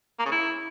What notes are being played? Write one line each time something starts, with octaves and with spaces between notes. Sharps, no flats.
A#3
C#3
E4